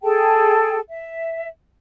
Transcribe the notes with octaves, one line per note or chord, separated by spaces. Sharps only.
G#4 A4 G5 A5
E5